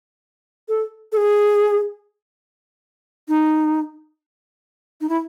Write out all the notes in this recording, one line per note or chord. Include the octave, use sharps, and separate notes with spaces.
A4
A4
G#4
D#4
D#4
E4